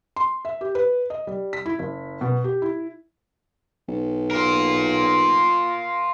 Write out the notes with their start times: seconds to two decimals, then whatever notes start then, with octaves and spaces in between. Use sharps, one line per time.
0.16 C6
0.45 E5
0.61 G4
0.75 B4
1.10 D#5
1.27 G3
1.53 B6
1.66 E4
1.79 F#1
2.21 B2
2.44 G4
2.62 E4
3.88 B1
4.31 F4 A#4